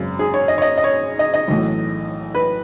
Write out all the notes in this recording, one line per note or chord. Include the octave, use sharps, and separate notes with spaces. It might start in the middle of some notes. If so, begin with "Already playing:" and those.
Already playing: G#1 F#2 C#3
G#4
C#5
D#5
C#5
D#5
D#5
C#5
D#5
D#5
B1 A2 E3 A3
B4